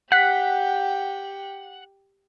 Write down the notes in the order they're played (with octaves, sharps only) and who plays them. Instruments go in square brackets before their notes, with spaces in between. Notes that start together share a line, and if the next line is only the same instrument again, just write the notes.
[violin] G4 G5 [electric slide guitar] F#5 [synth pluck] F#6 B6